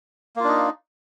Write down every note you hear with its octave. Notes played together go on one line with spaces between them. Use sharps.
A#3 D4 D#4 F4